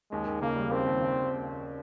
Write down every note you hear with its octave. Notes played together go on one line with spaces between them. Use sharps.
D#2 G#3
D#2
C#3 A#3
G3
D#2 C4
D#2
C#3